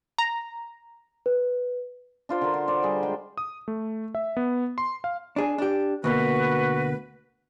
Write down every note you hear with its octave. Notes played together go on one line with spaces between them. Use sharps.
A#5
B4
D4 F4 C5 D5
D3 F#4 A#4
C5
C5 D5
G3 G#4
G#3 G5
D#6
A3
E5
B3
C6
F5
D4 G#4
D4 G4
D2 B2 A#3 F#4 B4